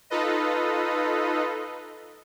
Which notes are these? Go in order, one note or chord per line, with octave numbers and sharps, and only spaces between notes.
D#4 F4 A4 B4 D#5